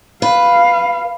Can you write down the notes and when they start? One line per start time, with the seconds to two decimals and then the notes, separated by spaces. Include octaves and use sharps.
0.22 B4 F5